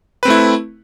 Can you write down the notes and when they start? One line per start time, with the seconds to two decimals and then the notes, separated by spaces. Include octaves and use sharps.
0.23 B4
0.25 C4
0.28 A3
0.30 E4